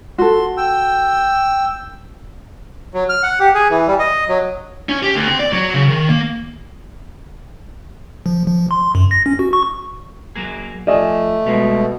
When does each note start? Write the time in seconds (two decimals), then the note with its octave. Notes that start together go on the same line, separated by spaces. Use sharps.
0.18 F#4 A4 C6
0.57 G5 E6
2.94 F#3
3.09 F6
3.23 F#5
3.40 G4
3.55 G#4
3.70 E3
3.87 G3
3.99 D#5
4.29 F#3
4.89 C#4
5.03 G4
5.15 D2
5.27 C4
5.39 D5
5.53 F#3
5.74 C#3
5.88 D#3
6.09 A#3
8.26 F3
8.47 F3
8.71 C6
8.95 F#2
9.11 A#6
9.26 C#4
9.39 F#4
9.53 C#6
10.35 F#3 A#3 G#4
10.87 F3 A3 D5 D#5 G#5
11.46 B2 G3 G#3 A#3